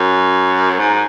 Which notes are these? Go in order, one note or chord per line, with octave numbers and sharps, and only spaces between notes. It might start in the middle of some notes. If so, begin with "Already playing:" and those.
Already playing: F#2
G#2